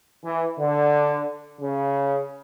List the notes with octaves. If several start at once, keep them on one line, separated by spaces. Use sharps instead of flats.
E3
D3
C#3